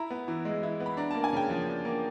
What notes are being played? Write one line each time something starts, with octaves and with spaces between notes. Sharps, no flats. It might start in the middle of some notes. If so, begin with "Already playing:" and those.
Already playing: E4 A#5
B3
E3
G#3
E4
B3
B5
D4 A#5
A#3 A5
G#5
C#3 G5
F3
D4
A#3